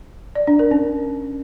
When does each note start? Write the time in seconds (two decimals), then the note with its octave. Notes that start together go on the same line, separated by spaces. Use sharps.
0.35 D5
0.47 D4
0.59 A#4
0.71 C#4